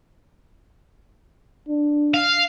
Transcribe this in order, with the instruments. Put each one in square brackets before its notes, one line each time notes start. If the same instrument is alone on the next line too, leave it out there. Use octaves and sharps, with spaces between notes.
[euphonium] D4
[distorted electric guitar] F5